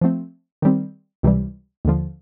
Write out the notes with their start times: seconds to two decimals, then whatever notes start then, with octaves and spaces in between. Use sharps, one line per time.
0.01 F3 A3 C4
0.62 D#3 G3 C4
1.23 C#2 C3 E3 G3
1.85 D#2 D3 F3